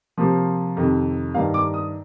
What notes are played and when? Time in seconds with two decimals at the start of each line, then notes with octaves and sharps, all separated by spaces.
0.17 C3 F3 A#3
0.77 F2 C3 D#3
1.34 G2 D#3 A#3 F5
1.54 D6
1.74 D#6